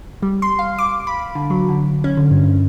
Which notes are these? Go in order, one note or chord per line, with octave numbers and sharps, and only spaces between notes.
G3
C6
F5
D6
B5
D3
F#3
D3
C#4
D3
G2